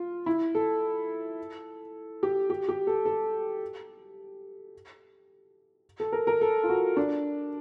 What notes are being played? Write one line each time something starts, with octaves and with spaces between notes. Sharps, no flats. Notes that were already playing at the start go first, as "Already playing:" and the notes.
Already playing: F4
E4
A4
G4
G4
G4
A4
A4
A4
A#4
A#4
A4
F4
F#4
D4